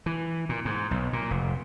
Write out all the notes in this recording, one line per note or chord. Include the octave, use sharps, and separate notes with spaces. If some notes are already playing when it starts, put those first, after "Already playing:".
E3
A#2
G#2
B1
A#2
F1